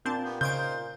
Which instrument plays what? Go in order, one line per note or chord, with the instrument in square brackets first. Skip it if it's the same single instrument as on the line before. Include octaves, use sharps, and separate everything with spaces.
[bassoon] A#2 [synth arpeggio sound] C4 D4 A5 [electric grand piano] G6
[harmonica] B3 G4
[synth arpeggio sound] C#3 G#6 D7 [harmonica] D#4 F4 C5 [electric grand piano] G6